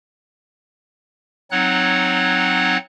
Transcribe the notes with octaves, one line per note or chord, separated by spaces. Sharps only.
F#3 C4 D#4 C#5 F#5 F#6